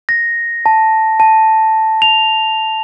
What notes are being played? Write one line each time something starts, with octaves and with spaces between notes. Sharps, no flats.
A#6
A5
A5
F7